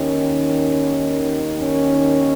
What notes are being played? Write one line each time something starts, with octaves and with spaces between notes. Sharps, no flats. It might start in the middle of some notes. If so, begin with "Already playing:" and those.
Already playing: D#2 D#3 C#4
C#4